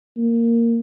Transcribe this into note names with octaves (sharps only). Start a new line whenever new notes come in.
A#3